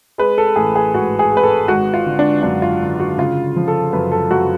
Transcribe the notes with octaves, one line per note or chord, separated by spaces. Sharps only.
G#3 B4
A4
A1 G#4
G#4
G#2 F#4
G#4
G#3
B4
A4
G#1 F#4
F4
D3
D4
F#2 D4
F4
D3
F#4
C#3 F4
F3
A4
F#2 B4
A4
F#2 F#4